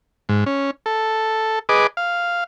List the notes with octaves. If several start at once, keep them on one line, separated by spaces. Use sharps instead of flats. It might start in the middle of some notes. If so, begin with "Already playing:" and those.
G#2
C#4
A4
G#4 B4 D#5 D6
F5